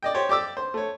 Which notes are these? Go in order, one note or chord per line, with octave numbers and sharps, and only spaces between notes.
D5 D#5 G5
G4 C5 C#5 G5
G4 D5 D6 E6
C5
A3 C#5